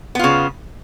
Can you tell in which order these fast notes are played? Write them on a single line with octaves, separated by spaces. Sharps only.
B3 F4 C#3